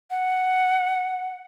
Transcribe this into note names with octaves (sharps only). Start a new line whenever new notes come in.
F#5